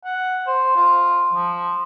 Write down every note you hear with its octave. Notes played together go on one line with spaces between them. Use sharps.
F#5
C5
F4
F3